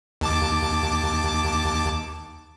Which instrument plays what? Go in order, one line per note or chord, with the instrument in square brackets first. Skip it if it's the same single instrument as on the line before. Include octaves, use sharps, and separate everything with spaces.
[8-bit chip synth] D#2 A5 D6